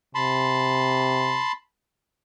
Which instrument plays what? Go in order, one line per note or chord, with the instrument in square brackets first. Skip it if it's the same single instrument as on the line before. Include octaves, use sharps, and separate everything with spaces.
[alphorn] C3 [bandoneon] A5 B5 C6